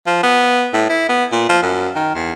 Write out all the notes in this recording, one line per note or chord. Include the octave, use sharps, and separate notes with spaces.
F3
B3
A2
E4
B3
A#2
F3
F#2
D#3
E2